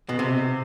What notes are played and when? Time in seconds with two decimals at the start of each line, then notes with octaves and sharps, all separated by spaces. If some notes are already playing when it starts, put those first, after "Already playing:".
0.09 B2
0.19 C3